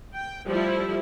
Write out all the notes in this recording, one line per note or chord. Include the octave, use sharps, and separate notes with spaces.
G5
F3 G3 A3 E4